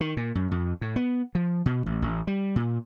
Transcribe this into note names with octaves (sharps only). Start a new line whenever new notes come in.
D#3
A#2
F#2
F2
A2
B3
F3
B2
A1
A1
G3
A#2